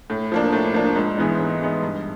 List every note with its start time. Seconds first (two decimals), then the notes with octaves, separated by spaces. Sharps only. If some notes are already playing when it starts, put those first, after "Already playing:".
0.10 A2
0.32 F3 A#3 D4
0.53 A2
0.74 F3 A#3 D4
0.96 G#2
1.17 E3 G#3 B3 D#4
1.39 G#2
1.60 E3 G#3 B3 D#4
1.82 G2